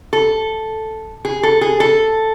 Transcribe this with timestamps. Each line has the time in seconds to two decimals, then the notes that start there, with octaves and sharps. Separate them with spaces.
0.13 A4
1.25 G#4
1.43 A4
1.61 G#4
1.80 A4